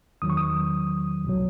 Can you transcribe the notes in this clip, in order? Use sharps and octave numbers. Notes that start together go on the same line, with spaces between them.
E2 D#3 F#3 D#6
C#6
D#6
B1 B2 F#3